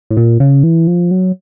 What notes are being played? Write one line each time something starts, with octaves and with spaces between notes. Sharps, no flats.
A2
A#2
C#3
E3
F3
F#3